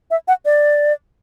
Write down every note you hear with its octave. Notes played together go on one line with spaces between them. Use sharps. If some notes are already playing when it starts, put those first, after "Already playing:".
E5
F#5
D5